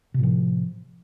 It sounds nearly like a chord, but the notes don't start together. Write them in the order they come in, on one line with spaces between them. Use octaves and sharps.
C3 A2 F3